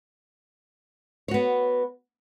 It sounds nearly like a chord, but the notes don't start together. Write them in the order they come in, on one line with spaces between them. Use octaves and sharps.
C#5 F#4 B3